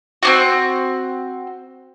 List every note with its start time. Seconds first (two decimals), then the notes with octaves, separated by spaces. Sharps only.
0.23 C4 D4 F#4